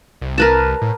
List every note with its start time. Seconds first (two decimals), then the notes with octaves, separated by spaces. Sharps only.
0.22 C2
0.38 A#4 B4 A5
0.82 A2